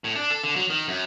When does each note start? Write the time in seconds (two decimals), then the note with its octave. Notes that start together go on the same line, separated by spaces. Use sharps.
0.04 A2
0.16 D4
0.30 A4
0.43 D3
0.56 F#3
0.70 D#3
0.88 F#2